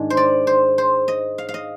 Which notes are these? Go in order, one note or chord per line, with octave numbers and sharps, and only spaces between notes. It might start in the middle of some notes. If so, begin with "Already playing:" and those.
Already playing: G#2 D#3 G#3 D4
C5
D5
C5
C5
D#5
F5
F5
D#5